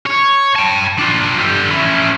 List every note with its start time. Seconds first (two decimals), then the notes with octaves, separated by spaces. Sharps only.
0.06 C#5
0.56 G5 A5
0.99 D4 F4
1.39 D3 G4
1.71 C#4 E4